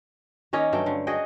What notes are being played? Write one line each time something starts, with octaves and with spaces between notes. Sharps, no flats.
D#3 A#3 C#4 D#5
G2 F#3 A3 G5
D3
F#4 G#4 D#5 G5